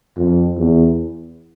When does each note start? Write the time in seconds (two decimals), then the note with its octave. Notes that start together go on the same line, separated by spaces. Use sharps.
0.17 F2
0.58 E2